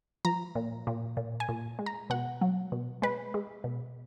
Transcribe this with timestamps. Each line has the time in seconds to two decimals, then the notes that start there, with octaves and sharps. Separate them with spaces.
0.25 F3 A#5
0.55 A#2
0.87 A#2
1.17 A#2
1.40 G#5
1.49 A#2
1.79 G#3
1.86 A#5
2.10 B2 F#5
2.41 F#3
2.72 B2
3.02 G#3 B4
3.34 G#3
3.64 B2